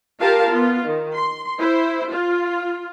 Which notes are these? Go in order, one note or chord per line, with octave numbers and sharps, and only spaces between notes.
F4 G4 A#4 F5 A5
B3 F4
D#3
C6
E4 C5
F4